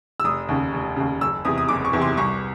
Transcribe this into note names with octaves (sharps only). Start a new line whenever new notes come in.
E6
F1 D#6
D#2 C#3
F1
D#2 C#3
F#1 E6
E2 C3 D#6
D#6
F#1 D6
C#6
E2 C3
C6
C2 C#6